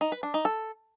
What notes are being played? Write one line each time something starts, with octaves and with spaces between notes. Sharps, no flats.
D#4
B4
D4
D#4
A4